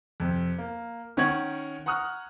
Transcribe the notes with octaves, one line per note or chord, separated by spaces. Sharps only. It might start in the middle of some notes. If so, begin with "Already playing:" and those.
F2 C3
A#3
D#3 C#4 F#5 C#6 G#6 F#7
F#5 A#5 C#6 D#6 F6 F#6